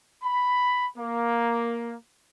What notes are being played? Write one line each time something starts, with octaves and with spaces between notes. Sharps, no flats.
B5
A#3